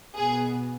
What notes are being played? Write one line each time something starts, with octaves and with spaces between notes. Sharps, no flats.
B2 B3 G#4